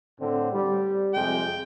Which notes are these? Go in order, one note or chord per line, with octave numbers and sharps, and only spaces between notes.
A2 D3 C4
G3
F2 C3 G#3 G5